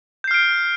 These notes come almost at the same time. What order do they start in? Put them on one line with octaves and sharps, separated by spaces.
G6 C7 F6 D7